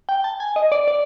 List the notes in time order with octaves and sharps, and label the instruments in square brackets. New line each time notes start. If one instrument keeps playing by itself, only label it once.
[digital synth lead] G5
A5
G#5
D#5
D5
D5